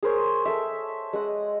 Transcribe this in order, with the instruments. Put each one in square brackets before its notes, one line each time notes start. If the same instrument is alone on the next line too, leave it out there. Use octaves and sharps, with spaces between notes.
[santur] G#4 A#4 C5 C#5
A4 E5
G#3 D#5 F#5